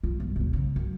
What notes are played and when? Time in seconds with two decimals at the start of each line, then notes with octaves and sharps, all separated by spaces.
0.03 F4
0.20 G1
0.36 E1 D2
0.53 C#3
0.76 F#2